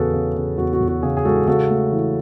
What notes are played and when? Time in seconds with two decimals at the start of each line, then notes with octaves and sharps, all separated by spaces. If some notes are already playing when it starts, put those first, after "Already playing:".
Already playing: E2 C#3 F#4 G#4 A4 B4
0.14 C#3
0.36 C#3
0.58 E2 F#4
0.73 F#4
0.81 E2
0.88 F#4
1.02 C#3 G#4
1.17 G#4
1.25 G#3 F#4 A4
1.48 C#3 F#4 A4
1.70 A3
1.92 E3